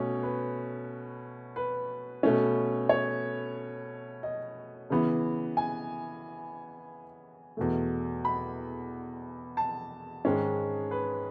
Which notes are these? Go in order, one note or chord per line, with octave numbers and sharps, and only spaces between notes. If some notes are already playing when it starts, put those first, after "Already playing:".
Already playing: B2 A3 C#4
B4
B4
B2 A3 C#4
C#5
D#5
C#3 E3 B3
G#5
E2 B2 A3
B5
A5
G#2 D#3 G#3 C#4
B4